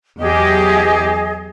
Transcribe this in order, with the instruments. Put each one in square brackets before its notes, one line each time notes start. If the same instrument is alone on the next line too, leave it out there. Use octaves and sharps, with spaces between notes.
[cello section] E2 F#3 G4 [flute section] G#4 D#5